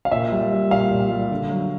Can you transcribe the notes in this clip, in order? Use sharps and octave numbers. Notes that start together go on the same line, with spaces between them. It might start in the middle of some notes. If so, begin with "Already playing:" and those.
F5
A#2 E5
G3
G3
A#2 F5
A#2
G3
D3
F#3